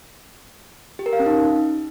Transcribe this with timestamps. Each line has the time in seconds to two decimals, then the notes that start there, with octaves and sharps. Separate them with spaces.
0.99 G4
1.06 A#4
1.13 F5
1.20 C#4
1.26 D#4